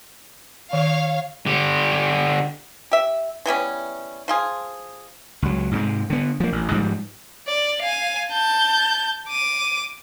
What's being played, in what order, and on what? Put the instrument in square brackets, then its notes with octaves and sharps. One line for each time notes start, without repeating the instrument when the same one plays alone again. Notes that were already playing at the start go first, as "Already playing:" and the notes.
[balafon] D#3 [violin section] C#5 F5
[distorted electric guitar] D3 G4
[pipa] G4 E5
E3 G3 B3 C#4
F3 F4 G#4
[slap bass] C#2 F#3
G#2 C3 G#3
D3 B3
F3 A#3
A1
G#2 F3 G3
[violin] D5
F5 G#5
A5 G6
D6 D#7